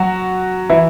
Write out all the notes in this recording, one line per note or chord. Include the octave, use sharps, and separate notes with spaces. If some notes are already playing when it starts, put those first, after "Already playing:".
Already playing: F#3 F#4
E3 E4